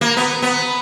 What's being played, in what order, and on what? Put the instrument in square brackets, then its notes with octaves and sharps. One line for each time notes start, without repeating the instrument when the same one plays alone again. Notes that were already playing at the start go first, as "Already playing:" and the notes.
[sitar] A#3
B3
B3